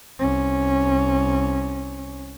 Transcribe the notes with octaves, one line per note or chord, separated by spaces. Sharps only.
C2 C#4